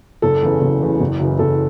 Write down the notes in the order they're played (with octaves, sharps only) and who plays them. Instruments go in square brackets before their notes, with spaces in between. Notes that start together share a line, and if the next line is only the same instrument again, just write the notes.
[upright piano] F#1 A4
E2 C#3 E3
F#1
E2 C#3 E3
F#1
F#2 C#3 E3
F#1 A4